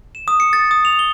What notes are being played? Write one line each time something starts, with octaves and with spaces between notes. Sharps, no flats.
E7
D#6
C#7
A6
D#6
F7
G7